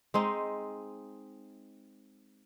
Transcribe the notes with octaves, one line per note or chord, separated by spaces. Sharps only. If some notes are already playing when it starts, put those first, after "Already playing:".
G#3 C4 D#4